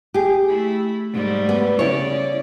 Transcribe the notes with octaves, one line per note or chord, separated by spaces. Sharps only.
G4 G#4
A3 E4
G#2 G3 A3
B3
C#3 E4 C#5 D5